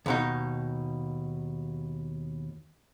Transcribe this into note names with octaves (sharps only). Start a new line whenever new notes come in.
D#2 B2 D#4